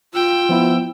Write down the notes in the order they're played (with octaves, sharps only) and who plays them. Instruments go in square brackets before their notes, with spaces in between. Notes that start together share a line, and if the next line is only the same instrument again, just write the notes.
[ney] F4 [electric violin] G5 E6
[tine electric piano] F3 B3 E4